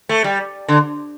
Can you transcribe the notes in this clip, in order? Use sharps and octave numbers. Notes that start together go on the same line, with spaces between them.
A3
G3
D3